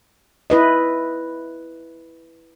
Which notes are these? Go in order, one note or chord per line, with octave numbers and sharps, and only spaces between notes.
E4 B4 D#5